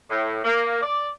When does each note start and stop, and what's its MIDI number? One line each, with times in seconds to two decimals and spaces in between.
0.10 0.39 45
0.44 0.80 58
0.82 1.08 74